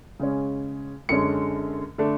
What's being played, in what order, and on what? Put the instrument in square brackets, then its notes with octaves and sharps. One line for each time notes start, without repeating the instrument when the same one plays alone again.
[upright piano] C#3 G#3 C#4
F#2 D3 G#3 C#4 C#7
D3 A3 D4